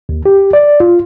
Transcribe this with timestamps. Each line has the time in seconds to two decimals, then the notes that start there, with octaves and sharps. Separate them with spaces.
0.09 D#2
0.26 G4
0.53 D5
0.80 F4